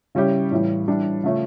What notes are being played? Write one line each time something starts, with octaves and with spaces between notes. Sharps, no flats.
C#3 G3 C#4 E4 G4
A2 E3 G3
E3 G3 D4
C#3 F3 A3 C#4